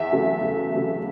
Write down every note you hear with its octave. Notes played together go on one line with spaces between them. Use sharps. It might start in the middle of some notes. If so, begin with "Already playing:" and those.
Already playing: E2 E5
C#3 F#3 A3
E2
C#3 F#3 A3